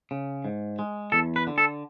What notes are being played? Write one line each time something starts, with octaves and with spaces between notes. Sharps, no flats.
C#3
G#2
G#3
E2 A4
B4
D3
A4